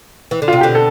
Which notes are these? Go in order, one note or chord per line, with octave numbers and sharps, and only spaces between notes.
E3
D3
C3 F4
B2 D3 G4
A4